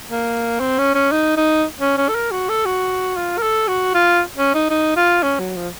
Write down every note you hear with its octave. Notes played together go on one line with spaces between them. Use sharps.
A#3
C4
C#4
C#4
D#4
D#4
C#4
C#4
A4
A#4
F#4
A4
F#4
F4
A#4
A4
F#4
F4
C#4
D#4
D#4
F4
C#4
F#3
F3